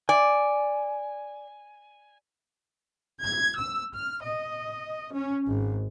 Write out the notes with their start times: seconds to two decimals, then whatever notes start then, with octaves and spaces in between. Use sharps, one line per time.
0.09 D5 G#5
3.23 G#6
3.58 E6
3.94 F6
4.23 D#5
5.13 C#4
5.45 G#1